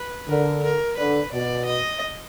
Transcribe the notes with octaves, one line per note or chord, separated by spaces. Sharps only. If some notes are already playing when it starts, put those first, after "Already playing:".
Already playing: B4
D3 A#4
A#4
D3 B4
B2 D5
D#5